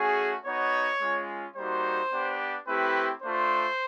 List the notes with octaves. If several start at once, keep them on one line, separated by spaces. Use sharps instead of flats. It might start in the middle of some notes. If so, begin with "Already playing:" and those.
Already playing: A3 C#4 F#4 G#4
B3 D#4 F#4 C#5
G#3 C#4 F4
G3 A#3 D#4 F#4 C5
B3 D4 G4
A3 C4 E4 G4 B4
A3 D4 F4 C5